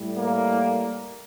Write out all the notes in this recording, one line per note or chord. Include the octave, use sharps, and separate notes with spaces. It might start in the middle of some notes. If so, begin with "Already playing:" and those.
Already playing: A2 G3
A#3